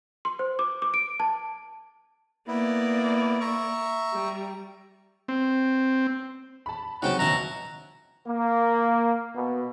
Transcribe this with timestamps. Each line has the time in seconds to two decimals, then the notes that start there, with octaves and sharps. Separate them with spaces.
0.25 C6
0.39 C5
0.59 D6
0.82 D6
0.94 D7
1.20 A5
2.47 A#3 B3 E4 D5
3.41 E5 A#5 C#6
4.13 G3
5.28 C4
6.66 A5 B5
7.02 C#3 F#3 C4 D#4 F#5 G5 A5
7.19 A#1 D#2 B2 E4 A5 A#5
8.26 A#3
9.35 B2